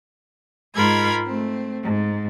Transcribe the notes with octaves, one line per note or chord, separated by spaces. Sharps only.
G#2 G#3 F4 A#4 B5 G#6
A3 C4
G#2